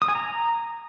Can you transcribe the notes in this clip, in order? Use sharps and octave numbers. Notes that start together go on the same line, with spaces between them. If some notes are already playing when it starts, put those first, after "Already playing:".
D#6
G#5
A#5